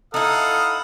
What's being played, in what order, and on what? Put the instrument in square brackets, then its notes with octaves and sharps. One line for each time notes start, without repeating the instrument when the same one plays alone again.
[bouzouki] D#4 E4 [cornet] A4 [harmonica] F5 F#5 D#6